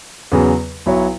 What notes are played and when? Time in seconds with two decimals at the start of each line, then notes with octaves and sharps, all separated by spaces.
0.32 E2 C#3 F#3 B3 G#4
0.86 B1 B2 F#3 E4 C#5